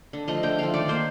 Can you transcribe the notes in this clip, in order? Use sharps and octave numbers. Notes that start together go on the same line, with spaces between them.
D3
F3 A3 D#5
D3 G5
F3 A3 F5
D#3 D5
A#3 C5